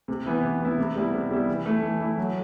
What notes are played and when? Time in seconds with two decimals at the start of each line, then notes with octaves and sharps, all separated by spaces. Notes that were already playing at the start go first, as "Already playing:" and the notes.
0.08 C3
0.26 E3 B3 E4
0.43 C3
0.61 E3 B3 E4
0.78 C3
0.95 G3 B3 E4
1.13 C3
1.31 G3 B3 E4
1.48 E3
1.66 A3 E4
1.83 E3
2.01 A3 E4
2.18 F#3